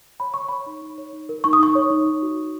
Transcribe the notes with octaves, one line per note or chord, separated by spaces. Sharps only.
C#5 B5
C#5 C#6
C#5 B5
D#4
D#4
C#5
D#4
A#4
D#4 C#6
D#6
D#4 C#6
C#5
D#4
D#4
F#4
D#4